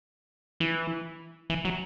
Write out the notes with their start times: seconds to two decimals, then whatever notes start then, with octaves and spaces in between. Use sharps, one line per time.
0.60 E3
1.50 E3
1.65 F#3